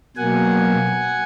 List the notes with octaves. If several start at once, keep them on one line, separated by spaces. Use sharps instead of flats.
B2 F#3 A#3 F#5 G#5